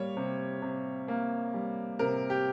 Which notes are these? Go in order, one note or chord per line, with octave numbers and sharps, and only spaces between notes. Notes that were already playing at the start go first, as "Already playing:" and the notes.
Already playing: G3 A#3 C#5
C3
C3
A#3
G3
C3 A#4
G4